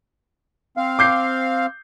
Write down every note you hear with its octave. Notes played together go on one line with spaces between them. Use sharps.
C4 F5
D6 G6 C7